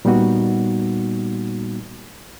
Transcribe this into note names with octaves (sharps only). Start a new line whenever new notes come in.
A#2 G3 A#3 B3 D#4 F#4